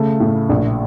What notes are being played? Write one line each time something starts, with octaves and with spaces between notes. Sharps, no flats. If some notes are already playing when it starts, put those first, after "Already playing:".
Already playing: C#3 A3
A2
A#1